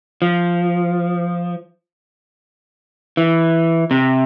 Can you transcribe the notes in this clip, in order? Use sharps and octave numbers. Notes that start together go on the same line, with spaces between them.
F3
E3
C3